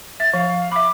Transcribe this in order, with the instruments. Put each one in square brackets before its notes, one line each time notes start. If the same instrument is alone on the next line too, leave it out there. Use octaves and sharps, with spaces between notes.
[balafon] E5 [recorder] A6
[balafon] F3 [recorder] F5
[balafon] E5 B5 [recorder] D6